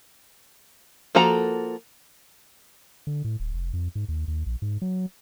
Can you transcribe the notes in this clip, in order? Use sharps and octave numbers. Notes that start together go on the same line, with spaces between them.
F3 A#3 F#4 A4 A#5
D3
A2
D1
F1
F2
G#2
D#2
D#2
A#1
G#2
F#3